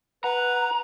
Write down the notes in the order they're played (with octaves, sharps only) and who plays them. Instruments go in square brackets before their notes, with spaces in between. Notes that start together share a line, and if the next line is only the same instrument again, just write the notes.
[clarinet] B4 [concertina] F#5 [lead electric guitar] A#5